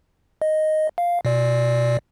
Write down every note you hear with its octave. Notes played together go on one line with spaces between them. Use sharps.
D#5
F5
B2 D5